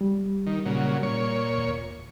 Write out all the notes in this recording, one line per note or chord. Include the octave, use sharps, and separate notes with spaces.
G3
D#3
A#2 C#3 F#3
A#2 C#5
D#2